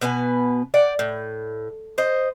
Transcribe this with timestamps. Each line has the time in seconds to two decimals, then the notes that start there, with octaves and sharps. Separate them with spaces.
0.01 B2 B3 B4 G#5
0.74 D5 F#5 G5
0.99 A2
1.98 C5 D#5